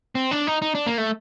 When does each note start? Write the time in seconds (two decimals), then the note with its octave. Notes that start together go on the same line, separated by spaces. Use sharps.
0.15 C4
0.31 D4
0.47 D#4
0.62 D#4
0.75 D4
0.87 A#3
0.98 A3